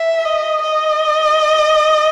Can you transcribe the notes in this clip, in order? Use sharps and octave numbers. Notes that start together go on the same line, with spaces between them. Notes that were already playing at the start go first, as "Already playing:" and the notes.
Already playing: E5
D#5
D#5